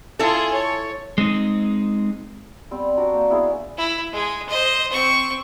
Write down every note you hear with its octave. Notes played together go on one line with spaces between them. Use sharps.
E4 F4 G#4 A4
C#5
G#3 C4 D#4
G3 B3 C4
D4 F#4 A#4
A#3 C5
B3 E4 G#4 F5
E4
G#3 G#4
C5 D#5
C4 C#6